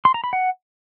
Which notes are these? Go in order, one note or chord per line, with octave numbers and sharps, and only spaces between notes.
C6
A#5
B5
F#5